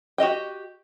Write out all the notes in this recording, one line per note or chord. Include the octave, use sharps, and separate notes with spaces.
F#4 G4 D#5 G5